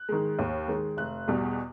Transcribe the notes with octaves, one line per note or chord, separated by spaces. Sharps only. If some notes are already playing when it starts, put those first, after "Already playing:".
Already playing: F#6
D#3 G#3
D#2
D#3 G#3
F1 F#6
E2 B2 G3